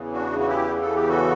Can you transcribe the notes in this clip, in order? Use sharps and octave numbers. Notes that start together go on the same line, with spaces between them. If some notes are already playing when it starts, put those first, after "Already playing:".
Already playing: E2 C#3 E3
D4 F#4
F#4
E4 G4
A4
G4
F#4 A4